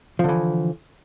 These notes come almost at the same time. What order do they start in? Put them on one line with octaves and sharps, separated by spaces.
F3 D3 E3